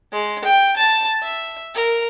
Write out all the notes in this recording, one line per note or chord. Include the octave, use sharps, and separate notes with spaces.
G#3
G5
A5
E5
A#4